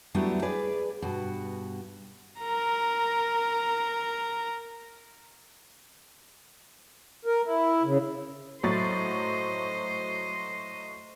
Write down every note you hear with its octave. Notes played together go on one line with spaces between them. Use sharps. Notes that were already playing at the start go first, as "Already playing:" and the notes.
F#3 G3 A3 B3 D4 E4
G#4 B4 D5
G2 B2 F#4
A#4 A#5
A#4
E4
C#3
A2 F#3 C5 D#5 A6